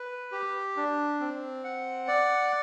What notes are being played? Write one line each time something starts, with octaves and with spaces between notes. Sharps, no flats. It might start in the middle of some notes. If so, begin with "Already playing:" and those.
Already playing: B4
G4
D4
C4
F#5
D5